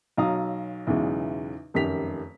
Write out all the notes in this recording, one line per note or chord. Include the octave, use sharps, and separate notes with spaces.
B1 F#3 F5 A#5 D#6
B1 E2 C#3 E3 G#3
F1 F#2 D#3 G4 B6 F7